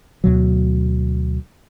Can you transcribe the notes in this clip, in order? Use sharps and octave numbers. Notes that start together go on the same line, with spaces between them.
D2 B2 F#3